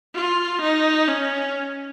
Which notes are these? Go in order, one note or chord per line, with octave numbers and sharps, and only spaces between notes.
F4
D#4
C#4